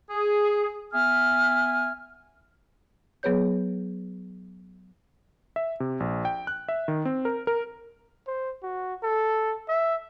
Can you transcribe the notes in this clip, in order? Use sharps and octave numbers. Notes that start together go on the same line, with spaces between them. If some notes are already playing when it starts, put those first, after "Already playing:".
G#4
B3 E5 G#5 F6
F#3 B3 G#4 B4 C#5 G6
E5
C3
A#1
G5
F#6
E5
D#3
C4
A#4
A#4
C5
F#4
A4
E5